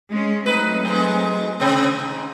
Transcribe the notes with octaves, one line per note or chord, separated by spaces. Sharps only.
G#3 C#4
F#3 A3 C4 D#4 B4
G2 G#3
C3 C4
G#2